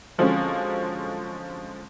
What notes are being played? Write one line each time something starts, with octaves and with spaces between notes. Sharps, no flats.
D3 F3 F#3 G#3 C4 C#4